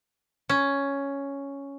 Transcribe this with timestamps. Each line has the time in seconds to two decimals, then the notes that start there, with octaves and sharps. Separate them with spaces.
0.49 C#4